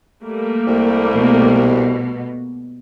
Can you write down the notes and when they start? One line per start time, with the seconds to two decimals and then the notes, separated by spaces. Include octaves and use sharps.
0.23 G3 A3 A#3
0.67 C2
1.14 B2